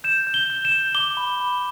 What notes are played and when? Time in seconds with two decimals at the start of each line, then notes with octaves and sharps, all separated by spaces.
0.04 G6 E7
0.27 G6
0.34 G7
0.50 G6
0.65 E7
0.72 G6
0.95 D6 G7
1.17 B5
1.40 B5